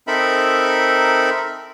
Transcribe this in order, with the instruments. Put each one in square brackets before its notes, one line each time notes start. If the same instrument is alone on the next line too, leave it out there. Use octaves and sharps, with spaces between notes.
[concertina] C4 D#4 A4 A#4 E5 B5